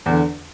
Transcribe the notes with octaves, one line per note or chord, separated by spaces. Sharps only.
E2 D3